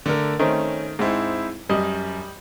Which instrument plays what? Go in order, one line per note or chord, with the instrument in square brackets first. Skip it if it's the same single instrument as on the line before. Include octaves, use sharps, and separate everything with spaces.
[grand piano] D3 A3 A#4
[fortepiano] D#3 A3 C4 [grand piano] C#4
[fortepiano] G#2 [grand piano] C4 D#4 E4
[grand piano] F#2 [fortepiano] G3 D#5